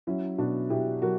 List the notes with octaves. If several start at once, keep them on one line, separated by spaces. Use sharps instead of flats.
F#3 C#4 E4
B2 D4 F#4
B2 E4 G4
F#3 F#4 A#4